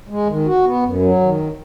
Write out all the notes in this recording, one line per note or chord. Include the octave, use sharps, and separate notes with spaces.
G#3
D#3
F#4
B3
F#2
F#3
D#3